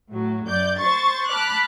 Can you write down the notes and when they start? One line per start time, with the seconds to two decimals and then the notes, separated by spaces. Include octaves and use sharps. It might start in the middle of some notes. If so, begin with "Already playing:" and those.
0.12 A2 F#3
0.47 F#2 D5 G6
0.79 C5 C6 C#6 A6
1.30 A5 B5 D6 F6 F#6